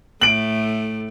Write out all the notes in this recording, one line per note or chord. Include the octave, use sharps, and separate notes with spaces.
A2 A3 D7 F#7